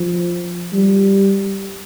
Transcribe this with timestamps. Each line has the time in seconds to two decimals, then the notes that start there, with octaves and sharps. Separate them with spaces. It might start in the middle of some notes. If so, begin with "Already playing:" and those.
Already playing: F3
0.73 G3